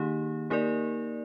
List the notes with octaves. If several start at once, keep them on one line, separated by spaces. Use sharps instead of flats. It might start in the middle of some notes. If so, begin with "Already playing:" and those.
Already playing: D#3 A#3 D#4 G4
A#3 D#4 G4 A#4 D5